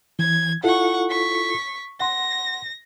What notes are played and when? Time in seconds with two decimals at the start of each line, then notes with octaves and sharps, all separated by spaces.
0.19 E3 G#6
0.64 E4 F4 A4 F#5 C#6
1.10 C#6 B6
2.00 F#5 C6 A#6